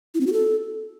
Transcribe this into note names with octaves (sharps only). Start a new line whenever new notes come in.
E4
C4
F#4
A4